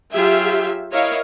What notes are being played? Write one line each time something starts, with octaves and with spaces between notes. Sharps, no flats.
F#3 F4 G4 G#4 E5
E4 A#4 C#5 D#5 F5